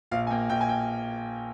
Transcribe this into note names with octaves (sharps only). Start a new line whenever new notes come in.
A#1 F5
G#5
A#3 G5
A#1 G5
G#5
G5